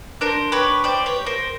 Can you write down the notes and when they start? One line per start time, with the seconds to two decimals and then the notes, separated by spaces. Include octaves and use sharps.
0.21 D4 A#4 C5
0.52 G4 B4 C#5
0.84 G4 C5 D5
1.06 B4 C#5
1.16 G4
1.26 A#4 C5